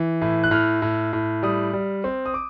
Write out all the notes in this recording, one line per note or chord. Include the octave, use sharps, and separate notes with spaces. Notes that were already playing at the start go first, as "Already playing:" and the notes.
Already playing: E3
A2
F#6
A2 F6
A2
A2
G3 D#6
G3
C4
D#6
D6